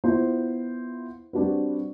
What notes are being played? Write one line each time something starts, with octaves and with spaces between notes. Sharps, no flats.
B3 E4 F4 C5
G3 C4 D4 F#4 B4